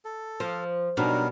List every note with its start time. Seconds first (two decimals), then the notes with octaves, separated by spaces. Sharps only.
0.05 A4
0.40 F3 C5
0.97 B2 F#3 G3 D4 D#4 A#4